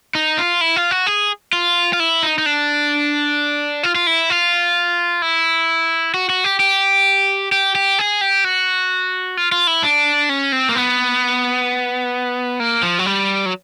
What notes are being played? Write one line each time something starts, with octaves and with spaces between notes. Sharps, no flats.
D#4
F4
E4
F4
F#4
G#4
F4
F4
E4
D#4
D#4
D4
F4
F4
E4
F4
E4
F#4
F#4
G4
G4
G4
G4
G#4
G4
F#4
F4
F4
E4
D4
C#4
C4
A#3
B3
A#3
F3
F#3
G3
F#3